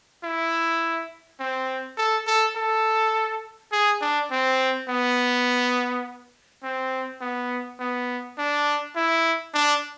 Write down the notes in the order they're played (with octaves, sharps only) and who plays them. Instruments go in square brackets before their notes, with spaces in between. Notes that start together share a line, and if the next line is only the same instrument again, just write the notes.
[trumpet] E4
C4
A4
A4
A4
G#4
D4
C4
B3
C4
B3
B3
D4
E4
D4